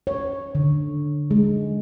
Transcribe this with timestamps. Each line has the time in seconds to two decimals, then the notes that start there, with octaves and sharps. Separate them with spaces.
0.07 C#5
0.55 D3
1.31 G#3